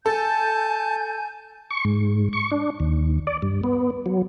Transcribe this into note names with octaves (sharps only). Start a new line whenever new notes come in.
A4 G#5 A5 G6
C#6
G#2
C#6
D4
D#2
D5
G2
B3
F#3